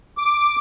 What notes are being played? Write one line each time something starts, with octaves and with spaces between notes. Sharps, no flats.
D6